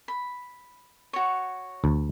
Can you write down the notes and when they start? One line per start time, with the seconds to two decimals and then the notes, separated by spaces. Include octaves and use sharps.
0.08 B5
1.13 F#4 C#5
1.84 D2